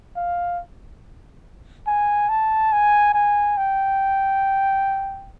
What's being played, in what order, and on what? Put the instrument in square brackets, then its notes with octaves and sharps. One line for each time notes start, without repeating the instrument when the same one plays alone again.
[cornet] F5
G#5
A5
G#5
G#5
G5